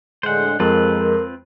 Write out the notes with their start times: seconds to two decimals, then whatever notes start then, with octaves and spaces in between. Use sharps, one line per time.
0.23 A2 D3 G#3 C5 F#5
0.60 F2 G#3 C4 F4 A#4 B4